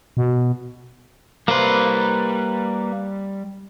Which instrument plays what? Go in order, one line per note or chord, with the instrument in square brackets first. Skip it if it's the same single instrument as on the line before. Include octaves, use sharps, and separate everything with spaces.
[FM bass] B2
[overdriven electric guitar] G3 C5 [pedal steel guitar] A#3 B4